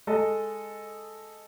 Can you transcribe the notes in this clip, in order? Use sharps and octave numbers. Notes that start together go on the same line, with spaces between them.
G#3 A4 D#5